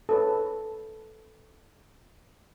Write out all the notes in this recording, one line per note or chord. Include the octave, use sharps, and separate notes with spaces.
A4 B4 C#5